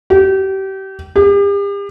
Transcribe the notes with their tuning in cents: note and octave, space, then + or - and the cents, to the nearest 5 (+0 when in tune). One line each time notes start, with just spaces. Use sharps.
G4 -30
G4 +40